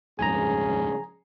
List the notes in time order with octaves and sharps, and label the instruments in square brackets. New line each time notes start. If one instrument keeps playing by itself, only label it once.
[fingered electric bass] D#1 F2 G#2 [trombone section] C#3 G#4 [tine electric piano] G#5 A#5